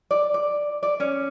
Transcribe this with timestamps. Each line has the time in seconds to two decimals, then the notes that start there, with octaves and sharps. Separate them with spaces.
0.11 D5
0.34 D5
0.83 D5
1.00 C#4